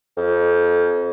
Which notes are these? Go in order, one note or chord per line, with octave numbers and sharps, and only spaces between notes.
F2